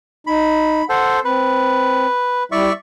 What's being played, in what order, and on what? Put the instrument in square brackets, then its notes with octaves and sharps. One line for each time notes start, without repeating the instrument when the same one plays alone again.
[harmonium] D#4 [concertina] B5
[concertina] A4 C5 [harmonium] F#5
[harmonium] C4 [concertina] B4
[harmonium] G3 E4 [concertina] D5 E5 C#6